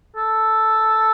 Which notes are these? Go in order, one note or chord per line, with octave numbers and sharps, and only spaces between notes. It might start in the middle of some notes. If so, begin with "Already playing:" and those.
A4